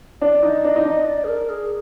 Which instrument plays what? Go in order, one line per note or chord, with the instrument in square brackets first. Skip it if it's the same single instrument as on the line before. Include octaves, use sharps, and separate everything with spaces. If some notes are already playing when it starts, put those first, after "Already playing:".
[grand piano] D4 [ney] D5
[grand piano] D#4
[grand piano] D4 [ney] D#5
[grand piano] D#4
D4
[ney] D5
G#4
A#4
G#4